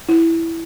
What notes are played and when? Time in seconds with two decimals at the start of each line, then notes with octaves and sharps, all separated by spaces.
0.09 E4